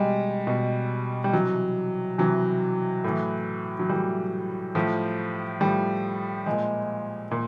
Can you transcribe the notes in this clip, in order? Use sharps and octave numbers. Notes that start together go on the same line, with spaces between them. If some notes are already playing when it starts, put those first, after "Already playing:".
Already playing: B2 G3 G#3
B2
G3
C3 E3 F#3
C3 E3 F#3
A2 E3
F#3
A2 E3 G3
A2 F3
A2 F3 G3
A#2 F3 G#3
A#2